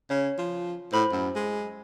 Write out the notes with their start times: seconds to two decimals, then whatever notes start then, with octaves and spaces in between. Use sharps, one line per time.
0.10 C#3 C#5
0.38 F3
0.92 A2 C5 B5
1.11 F#2
1.36 G#3